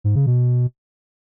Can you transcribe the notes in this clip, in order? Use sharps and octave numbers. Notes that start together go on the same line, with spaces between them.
G#2
C#3
B2